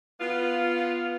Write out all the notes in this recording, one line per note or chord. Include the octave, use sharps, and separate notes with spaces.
B3 F4